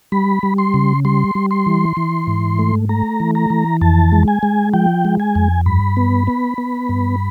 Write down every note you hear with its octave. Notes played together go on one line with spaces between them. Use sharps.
G3 B5
G3
C6
C#3
G3 C6
G3
C6
E3
E3
G#2
A3
A3 A#5
E3
A#5
E3
F2 A5
G#3
G#5
G#3
F3 G5
G#3
G#5
F2
G2 B5
B3
B3
B3
G2